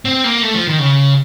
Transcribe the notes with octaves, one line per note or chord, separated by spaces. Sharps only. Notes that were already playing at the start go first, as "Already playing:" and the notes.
C4
A#3
A3
F3
D#3
C#3